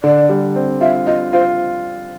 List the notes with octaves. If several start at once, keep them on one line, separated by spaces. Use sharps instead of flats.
D3 D5
G3
C4
F4 E5
F4 D#5
F4 C5